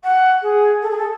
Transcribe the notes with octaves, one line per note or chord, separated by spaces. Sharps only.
F#5
G#4
A4
G#4
A4